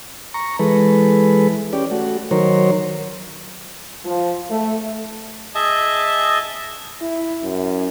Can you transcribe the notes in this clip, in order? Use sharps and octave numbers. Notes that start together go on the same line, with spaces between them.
A#5 C#6
E3 G#3 A4 B4
C#4 G4 D5
A3 F#4
D#3 F#3 A#4 C5 C#5
F3
A3
G#4 D#5 E5 A5
E4
F#2